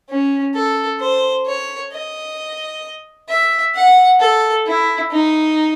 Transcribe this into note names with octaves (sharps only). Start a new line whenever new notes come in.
C#4
A4
C5
C#5
D#5
E5
F#5
A4
E4
D#4